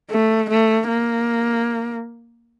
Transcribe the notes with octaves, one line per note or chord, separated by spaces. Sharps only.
A3
A3
A#3